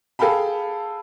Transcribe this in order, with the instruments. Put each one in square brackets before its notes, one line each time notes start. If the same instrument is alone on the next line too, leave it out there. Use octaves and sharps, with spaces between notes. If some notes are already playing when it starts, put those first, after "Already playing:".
[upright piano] G#4 A4 F5 G5 A5 B5